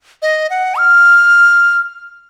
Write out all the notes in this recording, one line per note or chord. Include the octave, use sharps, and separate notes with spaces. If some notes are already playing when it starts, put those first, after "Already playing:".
D#5
F#5
F6